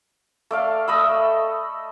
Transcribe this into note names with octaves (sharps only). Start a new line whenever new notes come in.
A3 D5 F5
A3 D#5 B5 E6